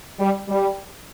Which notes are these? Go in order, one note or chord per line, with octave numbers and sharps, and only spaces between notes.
G3
G3